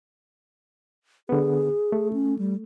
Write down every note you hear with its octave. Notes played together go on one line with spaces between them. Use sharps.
D3 B3 G#4
A3
C#4
G3